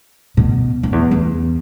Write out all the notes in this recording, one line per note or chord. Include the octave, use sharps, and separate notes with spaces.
B2
F#2
E2
E2